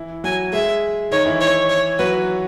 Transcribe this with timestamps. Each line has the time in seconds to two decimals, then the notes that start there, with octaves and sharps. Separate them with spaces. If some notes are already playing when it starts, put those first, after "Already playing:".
Already playing: E3 E4
0.24 F#3 F#4 G#5
0.53 G#3 G#4 E5
1.11 D#3 D#4 C#5
1.26 E3 E4
1.41 C#5
1.69 C#5
1.99 F#3 F#4 B4